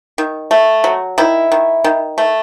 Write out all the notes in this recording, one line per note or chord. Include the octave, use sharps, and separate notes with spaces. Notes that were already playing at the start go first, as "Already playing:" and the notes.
D#3
A3
F#3
D#3 E4
D#3
D#3
A3